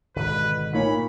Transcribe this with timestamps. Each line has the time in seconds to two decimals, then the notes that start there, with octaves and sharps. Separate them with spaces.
0.16 G#1 B2 D3 B4
0.73 A#2 D#4 C#5 G#5 B5